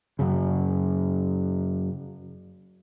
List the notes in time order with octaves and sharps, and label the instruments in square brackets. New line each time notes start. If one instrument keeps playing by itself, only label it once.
[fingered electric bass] F#2 C#3